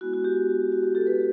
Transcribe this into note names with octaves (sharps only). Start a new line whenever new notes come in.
G#3 B3 E4 F#4
F#4
G4
F#4
G4
G4 A4
A4 B4